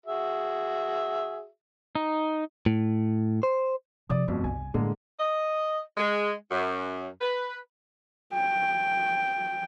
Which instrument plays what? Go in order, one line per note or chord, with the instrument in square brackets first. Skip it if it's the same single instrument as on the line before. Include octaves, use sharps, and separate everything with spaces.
[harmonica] F#4 G#4 E5
[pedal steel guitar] D#4
[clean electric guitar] A2
C5
[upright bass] C3 F3 [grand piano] D5 D#6
[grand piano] G1 F2 B2 [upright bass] A3
[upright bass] C2 [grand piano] G#5
[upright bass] A2 [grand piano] D3 G#3 A#3
[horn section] D#5
G#3
F#2
B4
[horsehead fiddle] G5